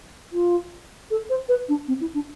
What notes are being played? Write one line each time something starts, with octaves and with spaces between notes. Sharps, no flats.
F4
A4
C5
B4
D4
C4
E4
D4